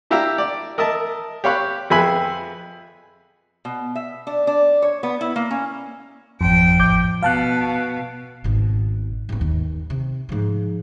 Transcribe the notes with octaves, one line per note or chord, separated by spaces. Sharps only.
D4 E4 G4 E5 F5 A#5
D5
A#4 D#5 E5 A5
G4 C#5 F5 B5 F#6
F2 G#4 B4 E5 G#5 B5
B2
E5
D4
D4
C#5
B3
E4
A#3
C#4
G#1 F2 F3 G5
A1 D6 G6
B2 F5 A5 F#6
G#1 B2
G#1 B3
D#2
C3
G#2 F3